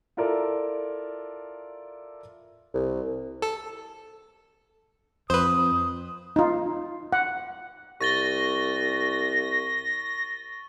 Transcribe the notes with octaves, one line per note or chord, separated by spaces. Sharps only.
E4 F4 A4 A#4 D5
C2
A4
F2 B4 C5 D#6
D#4 F4
F#5
C2 C#6 A6 A#6 G7